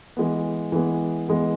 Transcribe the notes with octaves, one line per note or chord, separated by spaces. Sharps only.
E3 G#3 B3
E3 G#3 B3
E3 G#3 B3